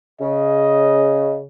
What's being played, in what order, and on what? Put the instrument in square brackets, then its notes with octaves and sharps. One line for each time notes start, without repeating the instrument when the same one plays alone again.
[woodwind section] C#3 [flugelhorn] D#5